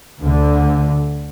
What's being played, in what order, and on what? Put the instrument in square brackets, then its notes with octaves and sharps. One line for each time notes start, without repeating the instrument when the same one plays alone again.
[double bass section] D2 D3